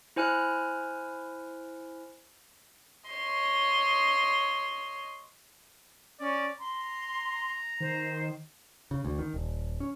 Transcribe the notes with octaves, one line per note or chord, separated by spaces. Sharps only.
E4 C5 G#5 F6 F#6
C#5 D#5 C6
C#4 D5
A#5 C6
D#3 C5
C#3
D2
D#3
D#1
C#4